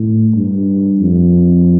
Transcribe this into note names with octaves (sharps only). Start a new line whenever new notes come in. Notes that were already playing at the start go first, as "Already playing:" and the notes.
Already playing: A2
G2
F2